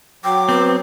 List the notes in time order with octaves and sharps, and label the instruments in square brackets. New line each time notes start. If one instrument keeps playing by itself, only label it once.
[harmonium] F#3 [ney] G5 [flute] D6
[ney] B3 [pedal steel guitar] C4